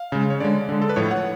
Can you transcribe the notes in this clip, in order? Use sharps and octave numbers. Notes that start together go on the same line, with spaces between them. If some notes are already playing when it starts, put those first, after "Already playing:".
Already playing: F5
C#3 G#3
C#5
D3 G#3 D5
D3 G#3
A4
B4
A2 F3 A3 C#5
F#5